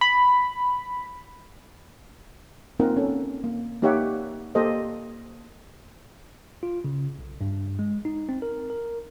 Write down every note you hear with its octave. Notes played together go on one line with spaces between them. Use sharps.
B5
A#3 C4 D#4 F4 A#4 F#5
C#4 A4
A#3
A#3 D#4 G4 C#5 E5 F#5
A#3 G4 A4 C5 D#5
F4
C#3
B1
G2
G#3
D#4
C4
A#4
A#4